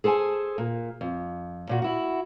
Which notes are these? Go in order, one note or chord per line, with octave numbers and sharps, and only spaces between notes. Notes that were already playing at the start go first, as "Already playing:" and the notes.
G#4 A4 C5 G5 G#5
A#2
F2
A#2 F#4
E4 F#4